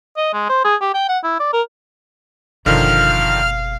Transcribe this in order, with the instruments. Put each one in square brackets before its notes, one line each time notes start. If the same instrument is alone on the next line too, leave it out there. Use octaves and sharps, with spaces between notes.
[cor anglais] D#5
G#3
C5
G#4
G4
G5
F#5
E4
D5
A#4
[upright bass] F#1 B2 [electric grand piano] D3 D#3 F3 [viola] F5 [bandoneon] F6